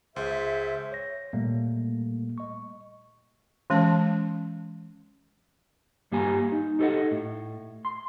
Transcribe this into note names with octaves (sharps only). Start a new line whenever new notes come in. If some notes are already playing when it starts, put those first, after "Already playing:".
C#2 G#4 C5 E5
C#5 A#6
A#2 G3 A3 A#3
D#5 C#6
E3 G#3 C#4 A5
G2 G3 A#3 G4 G#5 A#5
D#4
D#4 G4 A4 C#5 D#5 F#5
A2
C6